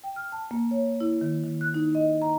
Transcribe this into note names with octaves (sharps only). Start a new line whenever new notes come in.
G5
F6
A5
A#3
C#5
E4
D#3
D#3
F#6
D#4
D#5
A#5